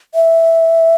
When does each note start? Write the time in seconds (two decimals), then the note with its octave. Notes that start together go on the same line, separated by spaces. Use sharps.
0.15 E5